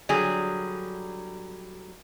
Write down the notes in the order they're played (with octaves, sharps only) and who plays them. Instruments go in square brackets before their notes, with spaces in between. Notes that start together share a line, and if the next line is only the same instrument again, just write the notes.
[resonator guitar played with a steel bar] D3 F#3 G3 G#4